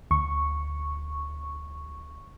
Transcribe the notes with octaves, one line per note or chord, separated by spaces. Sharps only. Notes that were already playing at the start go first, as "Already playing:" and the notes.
D2 C#6